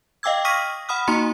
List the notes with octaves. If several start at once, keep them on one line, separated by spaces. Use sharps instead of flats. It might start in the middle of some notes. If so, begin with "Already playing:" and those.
D#5 F5 G5 D6 E6 G#6
C#6 D#6 F6 A#6 B6 D#7
F#5 B5 D#6 F6
A#3 D#4 F#4 A#5 C6 C#7